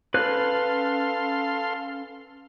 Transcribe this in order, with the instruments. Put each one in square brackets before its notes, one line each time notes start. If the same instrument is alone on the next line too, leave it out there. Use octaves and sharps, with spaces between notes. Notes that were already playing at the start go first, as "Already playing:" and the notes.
[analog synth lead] C#4 [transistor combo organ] A4 F5 C6 [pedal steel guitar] B4 F#6